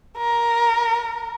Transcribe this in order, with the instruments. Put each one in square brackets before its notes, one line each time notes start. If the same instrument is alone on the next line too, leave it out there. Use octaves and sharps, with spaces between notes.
[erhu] A#4